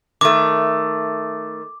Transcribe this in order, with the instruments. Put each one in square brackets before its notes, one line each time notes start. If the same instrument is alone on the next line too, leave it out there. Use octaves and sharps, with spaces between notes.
[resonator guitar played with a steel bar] D#3 A3 [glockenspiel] D6